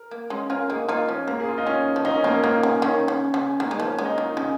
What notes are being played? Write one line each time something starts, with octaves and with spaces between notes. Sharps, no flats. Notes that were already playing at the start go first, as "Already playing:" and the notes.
Already playing: A#4
A#3
G#3 C#4
C#4 F4 A#4
A#3 D#4 G#4
A#3 D#4 F4
F3 C#4
C#3 A#3
G#4
F4
D#4
C#3 C#4
F3
D#3 D#4
C#4
F3 A#3
C#4
D#3 A#3
C#3
D#3 C#4
C#3
C#3
D#3 A#3
G#3
F3
C#4
G#3
D#4
F4
D#3
C#3 D#4